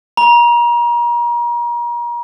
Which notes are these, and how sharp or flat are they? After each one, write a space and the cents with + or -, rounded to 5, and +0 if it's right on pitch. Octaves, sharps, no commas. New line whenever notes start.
A#5 +35